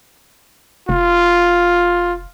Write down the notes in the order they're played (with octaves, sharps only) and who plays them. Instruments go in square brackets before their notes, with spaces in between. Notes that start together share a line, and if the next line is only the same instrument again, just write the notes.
[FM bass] F1 [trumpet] F4